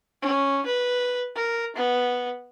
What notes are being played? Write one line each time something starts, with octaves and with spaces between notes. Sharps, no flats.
C#4
B4
A#4
B3